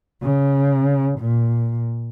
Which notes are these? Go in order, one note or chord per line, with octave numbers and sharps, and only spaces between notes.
C#3
A#2